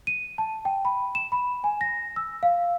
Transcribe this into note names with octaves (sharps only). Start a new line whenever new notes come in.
D#7
A5
G5
B5
E7
B5
G#5
A#6
E6
F5